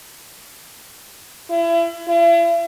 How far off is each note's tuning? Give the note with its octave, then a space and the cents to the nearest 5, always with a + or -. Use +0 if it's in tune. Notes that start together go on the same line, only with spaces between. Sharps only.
E4 +35
E4 +45